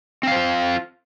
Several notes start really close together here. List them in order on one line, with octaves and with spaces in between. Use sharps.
C4 F5 C5 F4